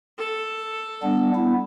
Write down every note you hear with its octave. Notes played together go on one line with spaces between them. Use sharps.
A4
G3 B3 D4
B3 E4